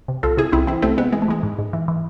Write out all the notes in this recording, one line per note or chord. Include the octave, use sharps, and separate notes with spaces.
C3
C2 F4 A4
C3 E4 G#4
C2 C4 E4
E3 C4 E4
C2 A3 C4
C3 G#3 B3
E3 G#3
A3
E3 G#3
G#2
G#2
E3
E3